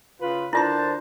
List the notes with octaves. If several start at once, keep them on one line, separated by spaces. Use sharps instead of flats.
C#3 F4 B4
D3 D4 E4 F4 A#4 C5 A5 C6